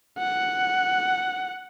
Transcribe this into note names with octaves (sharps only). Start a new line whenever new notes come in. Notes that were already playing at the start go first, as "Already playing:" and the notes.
F#5